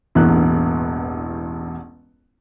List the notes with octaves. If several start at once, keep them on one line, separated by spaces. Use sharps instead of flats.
E1 A1 E2 G2 A#3 F#6